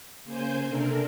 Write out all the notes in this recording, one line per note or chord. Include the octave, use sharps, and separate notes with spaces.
C#3 A#3 C5 G#5 G6
C3 D4 A4 A#4